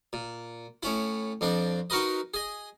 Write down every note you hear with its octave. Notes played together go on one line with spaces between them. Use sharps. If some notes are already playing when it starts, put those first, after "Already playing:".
A#2
A2 C#4 E4
F2 C4 D4
D#4 F#4 A#4 B4 D#5
G#4 D#5